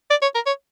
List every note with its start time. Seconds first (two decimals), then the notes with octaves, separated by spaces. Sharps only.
0.10 D5
0.22 C#5
0.35 A#4
0.47 C#5